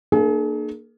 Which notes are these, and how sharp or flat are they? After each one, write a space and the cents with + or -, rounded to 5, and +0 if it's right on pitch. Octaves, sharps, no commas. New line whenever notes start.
A#3 +0 D4 +40 G#4 +40